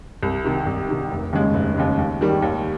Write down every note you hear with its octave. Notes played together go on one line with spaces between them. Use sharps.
C2
C3 D#3
C2
C3 D#3
F1
D#2 C#3 G#3
F1
D#2 C#3 G#3
D#2
D#3 G3
D#2